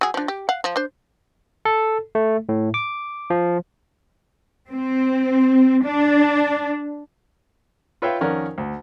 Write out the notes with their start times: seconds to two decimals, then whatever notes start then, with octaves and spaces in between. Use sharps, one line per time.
0.01 F#3 G#4
0.14 F3 D4
0.28 G4
0.49 F5 F#5
0.64 F3
0.76 D4 C5
1.65 A4
2.15 A3
2.49 A2
2.74 D6
3.30 F3
4.70 C4
5.84 D4
8.02 F4 B4 C#5 E5 F5 G5
8.21 F2 D#3 C#4 A#4 D5 F#5
8.58 D2